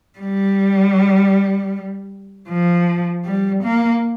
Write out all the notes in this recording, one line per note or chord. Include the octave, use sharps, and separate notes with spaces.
G3
F3
G3
A#3